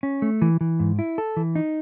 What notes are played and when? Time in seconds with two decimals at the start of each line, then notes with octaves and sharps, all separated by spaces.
0.03 C#4
0.22 A3
0.42 E3
0.61 E3
0.80 G#2
0.99 E4
1.18 A4
1.37 E3
1.55 D#4